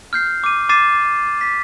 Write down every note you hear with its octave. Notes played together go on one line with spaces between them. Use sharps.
F6 G6 C7
D6 D#7
D6 A6 C7 D#7 E7
B6